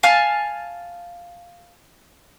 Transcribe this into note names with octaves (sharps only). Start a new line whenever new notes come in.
F5 G#5 A5 F6